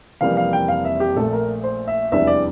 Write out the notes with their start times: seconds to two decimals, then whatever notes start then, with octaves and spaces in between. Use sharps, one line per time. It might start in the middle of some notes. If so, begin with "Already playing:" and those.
0.21 F1 F2 E3 G3 A#3 F5
0.37 F5
0.53 G5
0.68 F5
0.85 E5
1.00 G4
1.16 A#1 A#2 A3 A4
1.32 A#4
1.64 C5
1.88 E5
2.12 F1 E2 E3 G3 D4 E5
2.27 D5